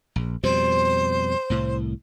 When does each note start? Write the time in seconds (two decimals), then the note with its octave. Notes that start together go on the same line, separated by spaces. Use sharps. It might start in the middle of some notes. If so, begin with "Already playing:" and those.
0.16 A#1
0.44 F2 B2 G3 C5
1.50 C2 A2